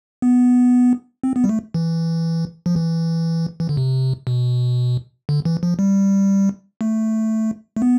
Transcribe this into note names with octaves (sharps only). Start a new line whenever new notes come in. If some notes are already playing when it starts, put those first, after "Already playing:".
B3
C4
B3
G3
A3
E3
F3
E3
E3
D3
C3
B2
D3
E3
F3
G3
A3
A3
B3